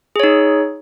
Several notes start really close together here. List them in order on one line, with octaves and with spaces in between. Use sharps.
G#4 C#5 D#4